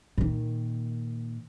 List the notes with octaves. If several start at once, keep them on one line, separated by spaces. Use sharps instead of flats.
A#2 D#3